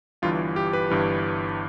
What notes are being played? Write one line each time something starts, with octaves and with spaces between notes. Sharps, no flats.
G1 G2 E3 F4
G4
B4
G1 G2 E3